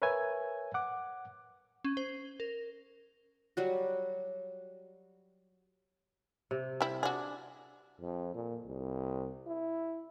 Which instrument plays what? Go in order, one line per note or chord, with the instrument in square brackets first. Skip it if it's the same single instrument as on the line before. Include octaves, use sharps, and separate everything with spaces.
[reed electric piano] A#4 B4 C#5 E5 G#5
F#5 D6
[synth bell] C#4
C5
A#4
[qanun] F#3 G3 F#4
[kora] C3
[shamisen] G3 E4
[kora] D4 [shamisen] F#4 G#4
[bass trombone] F2
A#2
C2
E4